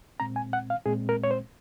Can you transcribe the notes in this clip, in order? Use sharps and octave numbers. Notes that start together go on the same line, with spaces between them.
A#2 G#3 C4 A#5
G#5
F#5
F5
A#2 G#3 C4 G#4
A#4
C#5
C5